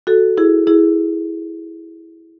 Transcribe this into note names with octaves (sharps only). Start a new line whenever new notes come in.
F#4 A4
E4 G#4
E4 G#4